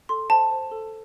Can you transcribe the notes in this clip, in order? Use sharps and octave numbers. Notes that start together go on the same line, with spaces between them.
A4 C6
C5 A5
C5
A4